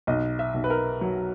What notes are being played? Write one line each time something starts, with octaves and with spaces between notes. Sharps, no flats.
B1 D#5
E5
B1
B4
A#4
F#3